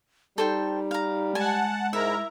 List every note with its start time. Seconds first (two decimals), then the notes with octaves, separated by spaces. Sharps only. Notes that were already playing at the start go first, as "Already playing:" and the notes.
0.38 G3 D#4 A4 C5 G5
0.91 F5 A#5
1.35 G#3 F#5 G#5 A5
1.93 G#2 E4 A#4 E5 A#5